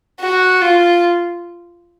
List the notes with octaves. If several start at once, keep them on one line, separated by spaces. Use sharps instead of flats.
F#4
F4